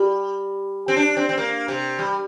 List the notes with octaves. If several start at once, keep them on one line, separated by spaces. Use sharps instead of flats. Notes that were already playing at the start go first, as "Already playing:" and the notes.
Already playing: G3
C4
D4
C4
C4
A#3
C3
G3